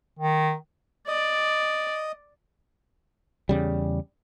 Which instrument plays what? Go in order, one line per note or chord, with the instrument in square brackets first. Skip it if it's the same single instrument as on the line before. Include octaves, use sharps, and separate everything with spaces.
[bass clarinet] D#3
[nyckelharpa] D5 [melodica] D#5
[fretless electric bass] E2 C#3 G3